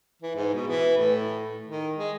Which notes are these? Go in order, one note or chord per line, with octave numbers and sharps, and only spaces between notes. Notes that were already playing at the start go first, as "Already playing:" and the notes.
E3
G#2
B2
E3
A2
D#3
G#3